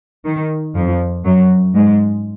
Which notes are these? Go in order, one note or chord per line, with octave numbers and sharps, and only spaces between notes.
D#3
F2 F3
F#2 F#3
G#2 G#3